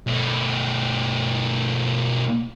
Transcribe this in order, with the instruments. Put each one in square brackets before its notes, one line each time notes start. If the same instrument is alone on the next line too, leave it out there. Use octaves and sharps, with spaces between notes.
[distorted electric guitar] B2 A3